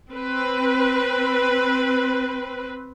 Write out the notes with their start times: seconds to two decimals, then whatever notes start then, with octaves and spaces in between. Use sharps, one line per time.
0.13 C4 B4